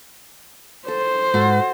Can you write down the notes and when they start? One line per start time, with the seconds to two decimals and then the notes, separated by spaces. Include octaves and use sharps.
0.88 A4 C5
1.34 G#2 F#4 A4